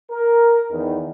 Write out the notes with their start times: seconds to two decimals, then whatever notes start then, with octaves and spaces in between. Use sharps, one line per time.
0.11 A#4
0.71 E2 D#3